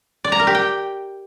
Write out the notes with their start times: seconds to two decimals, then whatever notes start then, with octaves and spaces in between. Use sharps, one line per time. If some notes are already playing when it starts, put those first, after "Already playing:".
0.24 D5
0.32 A#5
0.40 A#4
0.47 G4
0.55 G5